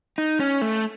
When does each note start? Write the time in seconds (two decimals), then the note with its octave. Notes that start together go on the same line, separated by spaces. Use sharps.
0.18 D#4
0.40 C#4
0.62 A3